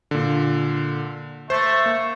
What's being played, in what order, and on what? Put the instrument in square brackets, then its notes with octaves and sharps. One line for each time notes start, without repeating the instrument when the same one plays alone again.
[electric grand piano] A#2 D3
[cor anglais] A3 [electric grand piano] C5
[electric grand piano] A#3